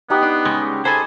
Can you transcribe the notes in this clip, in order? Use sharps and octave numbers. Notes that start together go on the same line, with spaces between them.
B3 D#4 G4
D4
C#3 G3 G#3
G#4 A4 C5 G#5 B5